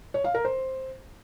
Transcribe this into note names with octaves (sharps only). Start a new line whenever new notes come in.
C#5
F5
A#4
C5